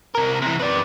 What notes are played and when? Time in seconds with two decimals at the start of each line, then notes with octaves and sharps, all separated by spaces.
0.15 C3 A#4
0.42 C3 E3
0.60 B4 D5